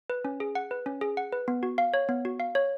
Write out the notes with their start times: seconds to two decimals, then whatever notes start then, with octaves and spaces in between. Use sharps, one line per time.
0.10 B4
0.25 C#4
0.40 G#4
0.55 F#5
0.71 B4
0.86 C#4
1.01 G#4
1.17 F#5
1.32 B4
1.48 B3
1.63 F#4
1.78 F5
1.94 C#5
2.09 B3
2.25 F#4
2.40 F5
2.55 C#5